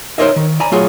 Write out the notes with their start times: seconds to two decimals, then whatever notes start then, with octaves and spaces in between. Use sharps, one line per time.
0.18 D#4 A#4 C5 C#5 D#5 E5
0.36 D#3
0.60 D5 G#5 A#5 B5
0.72 F#3 A3 F4 G#4